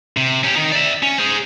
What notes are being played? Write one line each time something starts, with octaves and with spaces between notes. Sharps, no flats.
C3
C#4 G4
D#3 D#4
D5 E5
C#4
G#4 C5